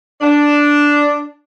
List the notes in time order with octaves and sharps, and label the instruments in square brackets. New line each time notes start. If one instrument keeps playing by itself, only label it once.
[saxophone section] D4